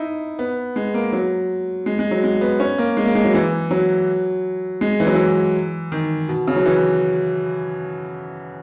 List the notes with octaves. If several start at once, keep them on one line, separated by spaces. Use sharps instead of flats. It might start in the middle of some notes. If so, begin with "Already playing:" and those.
Already playing: D#4 E4
B3
G#3
A#3
F#3
G#3
G#3
F#3
G#3
B3
C#4
A#3
G#3
A#3
G#3
F#3
E3
F#3
G#3
E3
F#3
E3
D#3
B2
C#3
F#3
E3